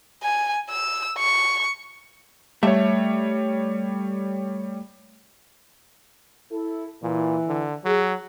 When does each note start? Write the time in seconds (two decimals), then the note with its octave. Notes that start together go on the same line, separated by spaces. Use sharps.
0.23 G#5
0.70 E6
1.18 C#6
2.63 G3 A3 C#5 E5
6.51 E4 A4
7.03 A#2 E3
7.48 D3
7.85 F#3 G#4